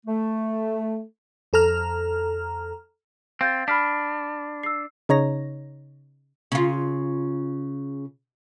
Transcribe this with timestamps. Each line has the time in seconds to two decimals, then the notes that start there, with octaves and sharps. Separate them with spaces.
0.06 A3
1.53 F2 A4 A#5 F6
3.41 C4 F5 G6 A6
3.68 D4 B5 F6 B6
4.63 E6 C7
5.09 C#3 D#4 C#5 A#5 A#6
6.52 C#3 F4